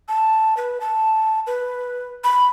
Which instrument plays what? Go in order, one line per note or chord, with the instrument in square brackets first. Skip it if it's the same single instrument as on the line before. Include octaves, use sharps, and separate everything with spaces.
[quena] A5
B4
A5
B4
B5